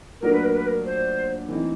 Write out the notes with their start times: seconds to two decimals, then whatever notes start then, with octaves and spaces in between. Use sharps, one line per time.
0.21 A#2 F#3 A3 D4 A#4
0.33 B4
0.44 A#4
0.55 B4
0.66 A#4
0.86 C5
1.48 E3 A3 C4 D#4